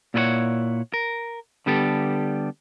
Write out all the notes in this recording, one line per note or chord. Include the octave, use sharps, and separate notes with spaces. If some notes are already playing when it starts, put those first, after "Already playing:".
A#2 E4 F4 B4 C#5 F#5
A#4
D3 G3 B3 G4 A4